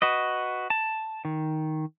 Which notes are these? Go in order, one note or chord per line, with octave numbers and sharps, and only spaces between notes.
F#4 B4 D#5
A5
D#3